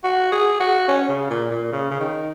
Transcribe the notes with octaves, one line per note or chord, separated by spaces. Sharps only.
F#4
G#4
F#4
C#4
C#3
A#2
A#2
C#3
C#3
D#3